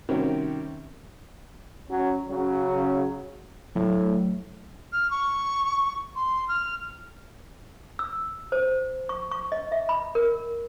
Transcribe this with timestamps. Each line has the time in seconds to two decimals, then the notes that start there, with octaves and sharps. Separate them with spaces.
0.09 C3 D#3 G3 C#4 F#4 A#4
1.89 F#3 C#4
2.30 C#3 F#3
3.76 A2 F#3 A3
4.93 F6
5.11 C#6
6.16 C6
6.48 F6
7.99 E6
8.52 C5
9.09 C#6
9.32 C#6
9.52 D#5
9.72 E5
9.89 B5
10.15 A#4